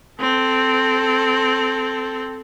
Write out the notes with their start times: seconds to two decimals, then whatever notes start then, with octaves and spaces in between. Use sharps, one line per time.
0.20 C4 A4